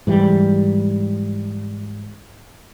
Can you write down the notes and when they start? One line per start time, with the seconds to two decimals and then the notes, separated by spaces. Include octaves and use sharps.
0.07 G#2 E3 G3